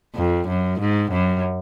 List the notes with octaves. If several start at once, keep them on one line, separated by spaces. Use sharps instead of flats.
F2
F#2
G#2
F#2